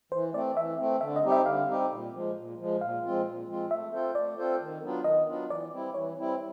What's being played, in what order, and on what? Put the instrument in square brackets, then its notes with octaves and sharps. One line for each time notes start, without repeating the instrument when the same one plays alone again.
[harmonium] E3 [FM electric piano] C5
[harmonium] A3 C4 [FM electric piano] D5
[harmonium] E3 [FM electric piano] E5
[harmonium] A3 C4
[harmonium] D3 [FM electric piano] E5
[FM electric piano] D#5
[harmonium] G3 C4 D#4 G4
[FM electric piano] E5
[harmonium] D3 [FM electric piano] F5
[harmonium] G3 C4 D#4 G4
A#2
F3 G#3
A#2
F3 G#3
[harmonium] A#2 [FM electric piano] F5
[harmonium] F3 G#3 C4 F4
A#2
F3 G#3 C4 F4
[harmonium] A3 [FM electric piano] E5
[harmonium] C4 F4 A4 C5
[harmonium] A3 [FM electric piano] D5
[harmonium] C4 F4 A4 C5
D#3
F#3 B3 D4 F4
[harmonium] D#3 [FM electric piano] D#5
[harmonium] F#3 B3 D4 F4
[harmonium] E3 [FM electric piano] D5
[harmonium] G3 C4 E4
[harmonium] E3 [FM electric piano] C#5
[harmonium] G3 C4 E4